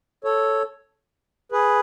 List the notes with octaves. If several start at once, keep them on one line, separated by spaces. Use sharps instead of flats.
A4 C#5
G#4 B4